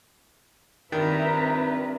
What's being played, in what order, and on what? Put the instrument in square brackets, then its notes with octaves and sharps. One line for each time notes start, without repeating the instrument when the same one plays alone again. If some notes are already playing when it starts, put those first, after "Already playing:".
[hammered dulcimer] G2 D#4 F4 [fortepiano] D#3 [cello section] C4 B4 [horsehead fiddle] E5 A#5